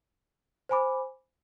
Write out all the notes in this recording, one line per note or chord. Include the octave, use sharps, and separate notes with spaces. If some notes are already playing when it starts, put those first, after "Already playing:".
C5 G#5 B5 D6